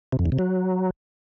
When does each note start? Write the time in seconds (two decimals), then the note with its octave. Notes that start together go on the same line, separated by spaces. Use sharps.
0.12 C3
0.19 F2
0.26 E2
0.32 C3
0.39 F#3